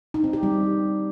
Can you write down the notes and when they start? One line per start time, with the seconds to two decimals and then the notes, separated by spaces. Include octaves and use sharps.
0.14 D#4
0.24 C4
0.33 G4
0.43 G3